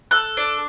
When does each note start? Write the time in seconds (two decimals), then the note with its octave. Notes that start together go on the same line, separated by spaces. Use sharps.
0.11 A4 F#6
0.37 D4